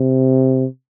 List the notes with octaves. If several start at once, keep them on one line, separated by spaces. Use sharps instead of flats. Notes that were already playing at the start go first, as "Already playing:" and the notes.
Already playing: C3